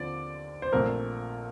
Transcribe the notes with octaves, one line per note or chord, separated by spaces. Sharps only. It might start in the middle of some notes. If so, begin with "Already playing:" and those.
Already playing: D#2 D3 F3 C4 D5
C5
A#1 A#2 A3 C4 A#4